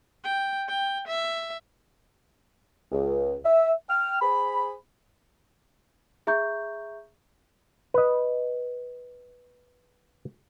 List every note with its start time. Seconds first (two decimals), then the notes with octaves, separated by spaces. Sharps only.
0.24 G5
0.69 G5
1.08 E5
2.92 C#2
3.44 E5
3.89 G5 F6
4.21 G#4 C5 B5
6.27 G#4 E5 A#5 C#6 G6
7.94 B4 D#5